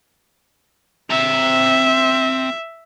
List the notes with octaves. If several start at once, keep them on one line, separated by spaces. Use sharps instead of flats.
C4 E5 A#5